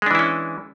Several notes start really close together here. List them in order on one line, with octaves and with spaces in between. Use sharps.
G#3 D4 E3 E4 C#4